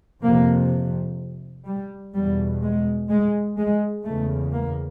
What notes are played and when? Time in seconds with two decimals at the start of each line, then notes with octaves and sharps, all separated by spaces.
0.23 F2 C3 A#3
1.66 G3
2.14 E2 B2 G3
2.62 G#3
3.09 G#3
3.57 G#3
4.04 E2 C#3 A3
4.53 A#3